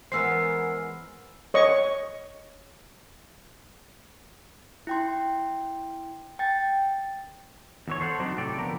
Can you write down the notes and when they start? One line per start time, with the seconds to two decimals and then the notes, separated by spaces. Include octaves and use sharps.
0.12 E2 G#3 B3 A#4 C5 F#5 E6 C7
1.54 C#5 D#5 C#6
4.87 E4 G5 C6
6.39 G5 A6
7.88 E2 E3 C#5
8.00 A4 C5 E5 F#5
8.20 F#3 C4 D4 D#4
8.38 A2 C3 A4 D5 G5
8.59 D3 F3 B3 A#4